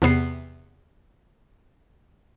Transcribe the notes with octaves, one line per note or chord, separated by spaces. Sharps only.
E2 C3 B3 C7